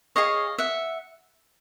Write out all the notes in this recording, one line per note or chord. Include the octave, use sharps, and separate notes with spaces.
G#4 C#5 D#5 F5
E5 F#5